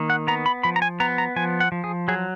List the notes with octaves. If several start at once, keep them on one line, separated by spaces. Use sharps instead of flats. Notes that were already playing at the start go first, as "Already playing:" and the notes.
Already playing: D#3 A#3
F#5
B3 A#5
B5
F3 B5
A#5
G#5
B3 A#5
A#5
F3 G#5
F#5
F3
G#4
F#3 G#4